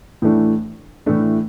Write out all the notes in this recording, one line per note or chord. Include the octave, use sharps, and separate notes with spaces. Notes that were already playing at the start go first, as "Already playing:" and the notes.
A2 E3 A3 D4
A2 E3 A3 D4